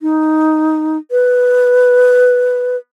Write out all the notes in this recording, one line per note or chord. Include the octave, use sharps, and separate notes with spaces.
D#4
B4